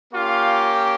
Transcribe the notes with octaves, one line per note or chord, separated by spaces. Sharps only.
A#3 C#4 F4 G4 F5